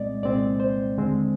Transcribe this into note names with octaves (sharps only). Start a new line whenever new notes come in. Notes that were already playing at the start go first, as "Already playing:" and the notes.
Already playing: C2 A#2 G#3 C4 D5 D#5
C2 A#2 G#3 C4 D5
C5
D#2 D3 G#3 C4